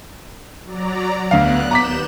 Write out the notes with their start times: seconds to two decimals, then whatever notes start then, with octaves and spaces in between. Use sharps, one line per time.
0.64 F#3 D5 A#5
1.31 D2 B3 F5 F#6
1.71 D#2 A#5 D6 G6 B6 E7